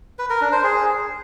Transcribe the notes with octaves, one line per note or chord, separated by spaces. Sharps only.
B4
A#4
D4
C5
G#4